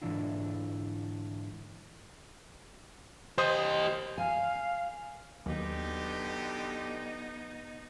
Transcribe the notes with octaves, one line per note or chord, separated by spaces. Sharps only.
G#2 D3 E3 D4 E4 F4
G4 C5 D#5 D#6
F5 G#5
D#2 B2 D3 F#3 B3 D#4 G4